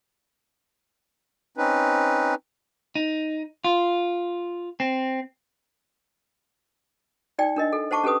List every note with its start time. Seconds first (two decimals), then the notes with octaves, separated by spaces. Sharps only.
1.57 C4 C#4 D#4 B4
2.95 D#4
3.64 F4
4.80 C4
7.39 D#4 D5 G5
7.56 D4 A#4 D#5
7.73 A4
7.91 C5 F#5 A5 C#6 D6
8.04 C#4 G4 A4 B4 D#6